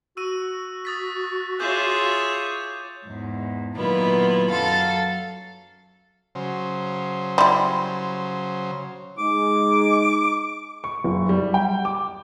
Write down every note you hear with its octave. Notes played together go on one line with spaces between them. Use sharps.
F#4 E6 D#7
D#6 A6 B6
F4 G#4 C#5 E5 D6 G6
E2 G#2
A#2 D#3 F#3 B3 E4 F4
F#2 F#3 A4 F5 A6
C#3 F#3 C5
G3 E4 C6
G#3 D#4 D6
C#6
F#1
G3
G5
D6